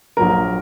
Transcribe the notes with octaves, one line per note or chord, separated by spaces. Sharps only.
A#1 A#2 F#3 A#4